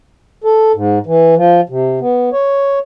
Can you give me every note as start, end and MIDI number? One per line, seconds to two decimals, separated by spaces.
0.44 0.72 69
0.75 0.99 44
1.06 1.35 52
1.37 1.61 53
1.69 1.99 48
2.00 2.30 59
2.33 2.79 73